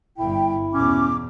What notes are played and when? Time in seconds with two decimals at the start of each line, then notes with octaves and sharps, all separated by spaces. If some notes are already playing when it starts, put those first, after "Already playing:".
0.18 G1 G2 E4 G5
0.74 E2 B2 C#4 D6